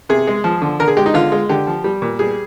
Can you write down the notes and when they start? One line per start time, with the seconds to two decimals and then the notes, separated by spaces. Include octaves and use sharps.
0.09 C3 G#4
0.27 G#3
0.44 F3
0.62 D3
0.80 D3 A#4
0.88 G#4
0.97 G#3 G4
1.06 D#4
1.14 D3 F4
1.32 G#3
1.49 D3 G4
1.67 F3
1.84 G3
2.02 A#2
2.19 G3 G#4